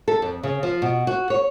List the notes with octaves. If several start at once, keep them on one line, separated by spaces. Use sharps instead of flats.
A4
F2
C#3
F3
B2
F#4
C#5